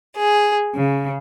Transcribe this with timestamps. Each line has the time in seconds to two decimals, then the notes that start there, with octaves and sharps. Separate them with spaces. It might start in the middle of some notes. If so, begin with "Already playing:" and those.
0.17 G#4
0.74 C#3